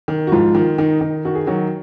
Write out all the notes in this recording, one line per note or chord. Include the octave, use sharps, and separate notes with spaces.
D#3
F#4
G#2 F3 F4
D#3
D#3 D#4
D#3
D#3 F#4
G#4
D#3 F#3 F#4